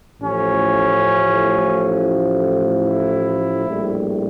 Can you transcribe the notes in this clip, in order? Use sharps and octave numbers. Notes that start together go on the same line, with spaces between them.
A1 A2 F3 C#4
E4
A#1 A2 G3